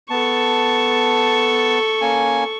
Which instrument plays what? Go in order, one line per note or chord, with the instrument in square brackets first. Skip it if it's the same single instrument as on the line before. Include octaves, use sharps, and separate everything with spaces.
[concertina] B3 A5 [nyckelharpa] A4 C#6
[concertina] A#3 C#4 G#5